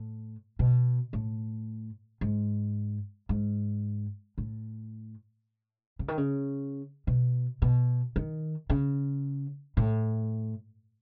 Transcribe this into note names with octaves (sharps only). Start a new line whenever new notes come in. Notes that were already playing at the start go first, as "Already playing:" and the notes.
Already playing: A2
B2
A2
G#2
G#2
A2
C#3
D#3
C#3
B2
B2
D#3
C#3
A2